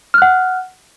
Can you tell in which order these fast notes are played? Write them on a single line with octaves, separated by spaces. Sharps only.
F6 F#6 F#5